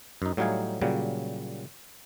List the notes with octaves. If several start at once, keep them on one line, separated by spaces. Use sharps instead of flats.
F#2 D#4
A2 F#3 G3 D#4 F5 G#5
A#2 C#3 F#3 G3